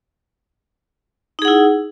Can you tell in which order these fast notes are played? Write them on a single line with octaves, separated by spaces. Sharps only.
D#4 G#4 F#5 E4